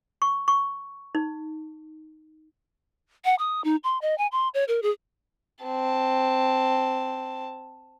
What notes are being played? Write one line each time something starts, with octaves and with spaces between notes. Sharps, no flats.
C#6
C#6
D#4
F#5
D#6
D#4
C6
D#5
G#5
C6
C#5
A#4
G#4
C4 A5